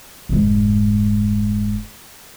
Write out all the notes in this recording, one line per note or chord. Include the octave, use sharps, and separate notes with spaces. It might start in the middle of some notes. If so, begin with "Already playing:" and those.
F1 G#2